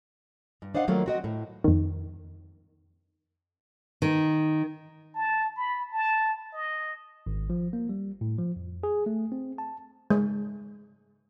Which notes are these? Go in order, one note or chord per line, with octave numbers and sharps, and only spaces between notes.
G2
D4 C5 D#5 F5 F#5
D#3 F3 F#3 A3 A#3 F4
C4 F#4 D#5
A2
F2 D#3
D#3
A5
B5
A5
D#5
G#1
F3
A#3
G3
A2
F3
F2
G#4
A3
C4
A5
G#3